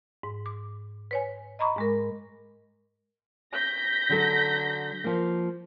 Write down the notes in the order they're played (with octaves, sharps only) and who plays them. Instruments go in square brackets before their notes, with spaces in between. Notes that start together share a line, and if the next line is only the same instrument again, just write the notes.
[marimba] G#2
D6
B4 C#5 G#5
D#5 A#5 B5 C#6 D6
G#2 G#3 A#4
[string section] G6 A#6 B6
[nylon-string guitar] D3 F#3 A4
F3 A#3